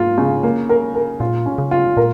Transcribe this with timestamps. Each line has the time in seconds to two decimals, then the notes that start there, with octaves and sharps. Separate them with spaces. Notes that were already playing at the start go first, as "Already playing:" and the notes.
Already playing: G#2 A#3 F4
0.18 C#3
0.43 A#3
0.69 A#4
0.95 A#4
1.20 A#2 F4
1.46 C#4
1.58 C#3
1.71 F4
1.97 A#2 A#4